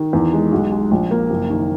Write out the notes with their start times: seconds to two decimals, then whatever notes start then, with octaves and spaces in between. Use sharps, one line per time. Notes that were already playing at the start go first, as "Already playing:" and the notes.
Already playing: D#3
0.13 E2
0.33 G#3
0.52 B1
0.72 G#3
0.91 A#1
1.11 A#3
1.30 F#1
1.50 D#3